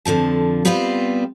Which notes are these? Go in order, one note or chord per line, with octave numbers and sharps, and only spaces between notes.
F2 D3 F3 A5
G3 B3 C4 F4 B4 C5